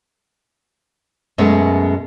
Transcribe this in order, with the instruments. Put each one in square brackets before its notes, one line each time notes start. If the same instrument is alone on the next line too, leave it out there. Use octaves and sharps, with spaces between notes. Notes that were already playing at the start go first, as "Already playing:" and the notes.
[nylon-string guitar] F#2 B2 G#3 A3 C#4